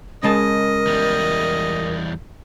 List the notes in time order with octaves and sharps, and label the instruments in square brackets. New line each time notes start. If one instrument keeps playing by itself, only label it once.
[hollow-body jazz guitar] C#3 G#3 A5 [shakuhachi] A#4 [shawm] D#5
[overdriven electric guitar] E2 G3